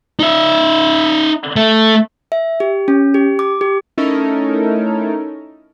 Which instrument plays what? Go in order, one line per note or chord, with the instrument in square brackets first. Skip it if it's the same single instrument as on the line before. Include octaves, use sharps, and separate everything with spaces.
[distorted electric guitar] D#4 E5
A3
[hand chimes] E5
G4
C#4
G4
D6
G4
[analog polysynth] A3 C#4 D#4 E4 A4 A#4